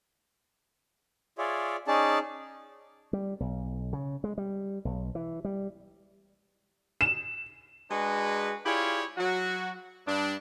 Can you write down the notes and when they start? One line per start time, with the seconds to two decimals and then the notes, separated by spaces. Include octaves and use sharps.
1.38 F4 G#4 C#5 D5 E5
1.87 C#4 D#4 G#4 D5 A5
3.13 G3
3.40 B1
3.93 C#3
4.24 G#3
4.38 G3
4.85 B1
5.15 E3
5.45 G3
7.01 E7
7.90 G#3 D4 F#4 G#4 B4
8.66 E4 F4 G4 G#4 C#5 D5
9.18 F#3 F#4
10.07 G2 D4